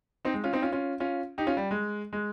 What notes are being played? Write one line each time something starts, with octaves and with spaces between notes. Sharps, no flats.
C4 D#4
G#3
C#4 F4
C4 D#4
C#4 F4
C#4 F4
C#4 F4
D#4 G4
C#4 F4
G3
G#3
G#3